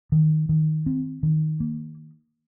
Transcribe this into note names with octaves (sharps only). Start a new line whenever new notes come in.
D#3
D#3
C4
D#3
A#3